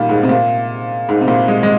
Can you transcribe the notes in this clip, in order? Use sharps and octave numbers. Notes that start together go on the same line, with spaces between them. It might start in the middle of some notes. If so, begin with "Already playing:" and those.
Already playing: A#2 D#3 G3
G#2
C3
A#2
G#2
C3
A#2
G#3
G#3